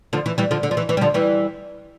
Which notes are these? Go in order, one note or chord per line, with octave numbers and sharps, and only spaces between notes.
D3 F3
E3
E3 G3
D3 F3
D3
F3
E3
E3
G3
D3 F3
E3 G3